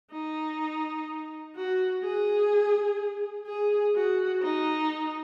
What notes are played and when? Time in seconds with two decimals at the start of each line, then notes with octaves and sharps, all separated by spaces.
0.12 D#4
1.55 F#4
2.03 G#4
3.46 G#4
3.95 F#4
4.42 D#4